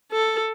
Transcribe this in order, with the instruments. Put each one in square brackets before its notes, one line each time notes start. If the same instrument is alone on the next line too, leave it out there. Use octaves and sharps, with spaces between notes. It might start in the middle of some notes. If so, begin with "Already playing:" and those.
[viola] A4